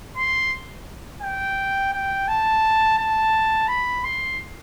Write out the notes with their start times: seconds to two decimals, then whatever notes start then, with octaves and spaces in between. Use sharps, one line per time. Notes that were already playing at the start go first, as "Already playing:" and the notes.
0.17 C6
1.22 G5
1.93 G5
2.28 A5
2.98 A5
3.68 B5
4.04 C6